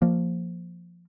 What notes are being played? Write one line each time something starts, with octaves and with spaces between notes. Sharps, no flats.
F3 A#3